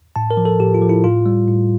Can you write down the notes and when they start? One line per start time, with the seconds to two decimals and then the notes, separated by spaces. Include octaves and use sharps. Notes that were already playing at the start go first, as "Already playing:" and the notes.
0.16 A2 A5
0.31 A#4
0.37 F3
0.45 A4
0.60 A2 G4
0.74 F4
0.82 F3
0.89 E4
1.04 A2 F4
1.26 G3
1.48 A2